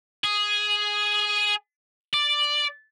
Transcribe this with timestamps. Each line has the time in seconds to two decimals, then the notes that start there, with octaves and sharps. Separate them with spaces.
0.24 G#4
2.14 D5